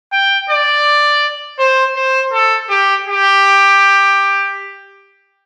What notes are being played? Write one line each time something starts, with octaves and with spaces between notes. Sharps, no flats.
G5
D5
C5
C5
A4
G4
G4